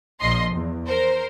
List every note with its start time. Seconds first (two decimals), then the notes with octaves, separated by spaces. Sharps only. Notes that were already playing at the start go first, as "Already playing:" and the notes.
0.20 A#1 F3 D#5 C6
0.53 E2
0.87 A#4 C5